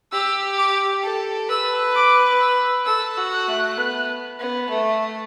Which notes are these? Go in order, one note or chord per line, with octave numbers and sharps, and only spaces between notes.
G4 E6
D6
A4
B4 E6
D6
E6
A4 E6
F#4
F#6
A3
B3
B3
A3